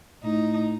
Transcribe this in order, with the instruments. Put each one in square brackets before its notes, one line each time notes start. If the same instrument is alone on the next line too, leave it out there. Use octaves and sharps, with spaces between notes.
[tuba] A2 [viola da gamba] D#4